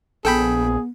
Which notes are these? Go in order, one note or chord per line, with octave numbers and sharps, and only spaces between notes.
A#1 B3 G#4 A4 G5 B5